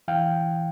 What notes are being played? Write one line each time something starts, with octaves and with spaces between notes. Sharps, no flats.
E3 F5 G5